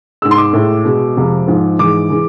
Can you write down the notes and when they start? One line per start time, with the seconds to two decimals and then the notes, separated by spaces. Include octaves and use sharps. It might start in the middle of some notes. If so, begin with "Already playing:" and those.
0.22 G#2 G#3 E6
0.31 C6
0.38 D6
0.53 A2 G#3
0.85 B2 G#3
1.16 F2 C3 G#3
1.47 G#2 F3 G#3
1.79 G#2 E3 G#3 D6
2.10 E3 G#3